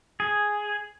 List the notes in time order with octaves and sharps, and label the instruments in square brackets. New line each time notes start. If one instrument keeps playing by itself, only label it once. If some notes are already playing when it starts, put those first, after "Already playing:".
[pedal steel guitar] G#4